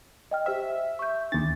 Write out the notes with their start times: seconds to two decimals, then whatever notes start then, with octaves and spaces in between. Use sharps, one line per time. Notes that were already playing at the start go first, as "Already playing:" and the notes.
0.31 D#5 G5 F6
0.46 G4 C5 E5 F6
0.99 C#6 G6
1.32 D#2 D4 A6